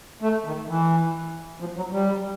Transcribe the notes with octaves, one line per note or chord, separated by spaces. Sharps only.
A3
D#3
E3
F3
F#3
G3